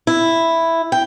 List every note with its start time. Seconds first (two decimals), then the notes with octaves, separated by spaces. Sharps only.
0.07 E4
0.92 G5